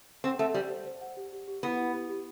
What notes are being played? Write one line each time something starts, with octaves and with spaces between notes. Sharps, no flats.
C4 F#5
A3 F#5
G3 C5
C5
C5
F#5
G4
G4
G4
B3 E4
E4
G4
G4